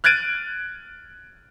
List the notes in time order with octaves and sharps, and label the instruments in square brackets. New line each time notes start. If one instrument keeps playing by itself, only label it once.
[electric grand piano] F6 F#6 G#6 A6 D7 D#7